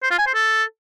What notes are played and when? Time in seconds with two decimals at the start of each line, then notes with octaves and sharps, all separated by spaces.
0.03 C5
0.11 F4
0.19 G#5
0.27 C5
0.35 A4